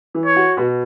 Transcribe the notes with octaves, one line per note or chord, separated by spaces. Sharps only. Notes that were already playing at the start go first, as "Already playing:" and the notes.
E3
C#5
F#4
B2